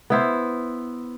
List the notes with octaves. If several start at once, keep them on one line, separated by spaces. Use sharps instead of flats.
B3 E4 C5